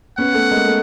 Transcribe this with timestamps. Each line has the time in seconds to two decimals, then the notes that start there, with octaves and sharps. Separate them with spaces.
0.17 B3 C#4 F#5
0.34 A3 B3
0.51 G#3 A#3
0.67 A3